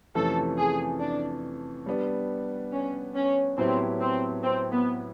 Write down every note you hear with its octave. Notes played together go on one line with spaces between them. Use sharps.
F2 C3 E3 A3 C#4 A4
G#4
D4
G3 B3 D4
C#4
C#4
A2 F#3 B3 C4 E4 G4
C4
C4
B3